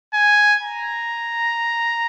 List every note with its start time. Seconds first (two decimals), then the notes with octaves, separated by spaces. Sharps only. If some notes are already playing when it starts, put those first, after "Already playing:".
0.14 G#5
0.62 A#5